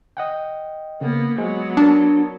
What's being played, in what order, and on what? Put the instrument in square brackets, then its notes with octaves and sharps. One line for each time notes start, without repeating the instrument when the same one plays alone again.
[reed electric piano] D#5 F#5 G5
[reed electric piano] C#3 [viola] A#3 B3
[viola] F#3 B3 [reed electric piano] G#3
[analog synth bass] D4 [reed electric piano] A#4 A5